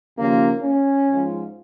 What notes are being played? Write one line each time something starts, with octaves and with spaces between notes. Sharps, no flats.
D#2 C#3 F3 A#3
C#4
G#2 F3